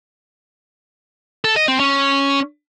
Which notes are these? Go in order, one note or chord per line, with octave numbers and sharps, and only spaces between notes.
A4
D#5
C4
C#4